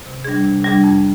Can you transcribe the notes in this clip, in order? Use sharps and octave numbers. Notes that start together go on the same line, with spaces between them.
C3
G3 D4 G#4
C3
G3 D4 G#4
F2